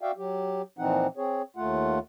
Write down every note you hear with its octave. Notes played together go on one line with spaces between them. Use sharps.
F#4 D5 E5 F5 G5
F#3 G4
A#2 E3 F3 C4 D#4 F#5
C4 G#4 C#5
D#2 A3 F4 F#5